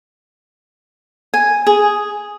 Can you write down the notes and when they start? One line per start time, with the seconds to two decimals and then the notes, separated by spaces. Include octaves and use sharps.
1.34 G#5
1.67 G#4